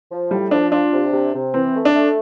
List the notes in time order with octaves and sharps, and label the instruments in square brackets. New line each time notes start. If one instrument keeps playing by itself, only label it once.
[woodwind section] F3
[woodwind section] A2 [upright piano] G3
[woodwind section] F3 [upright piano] D4
[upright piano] D4 [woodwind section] F4
[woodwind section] C3
C3
C3
[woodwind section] E3 [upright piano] C4
[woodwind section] A3
[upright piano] D4
[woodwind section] A3